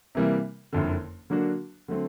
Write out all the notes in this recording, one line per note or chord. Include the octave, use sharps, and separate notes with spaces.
C3 E3 G3 A#3
F#1 F2 D3
D3 F#3 A#3 D4 F#4
D3 F#3 A3 C4